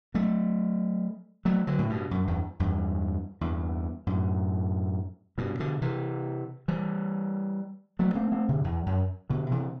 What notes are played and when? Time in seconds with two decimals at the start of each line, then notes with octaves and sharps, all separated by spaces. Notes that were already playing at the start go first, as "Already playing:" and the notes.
0.14 F#3 A3
1.45 F#3 A3
1.67 D3 F#3
1.79 A2
1.89 G2 B2
2.11 F#2
2.27 E2 G2
2.60 E2 G2
3.41 E2 G2
4.07 F#2 A2
5.38 G2 B2
5.60 B2 D3
5.81 C3 E3
6.68 E3 G3
7.99 F#3 A3
8.15 A3 C4
8.32 A3 C4
8.48 B2 D3
8.64 E2
8.86 F#2
9.30 B2 D3
9.51 C3 E3